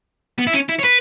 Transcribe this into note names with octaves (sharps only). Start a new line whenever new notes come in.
B3
E4
C#4
E4
C#5
B4